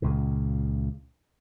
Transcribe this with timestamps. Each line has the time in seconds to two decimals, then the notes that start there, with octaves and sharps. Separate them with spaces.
0.02 C#2 A#2 C#3